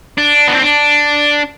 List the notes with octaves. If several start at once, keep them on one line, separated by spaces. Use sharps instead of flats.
D4
B3
C4
D4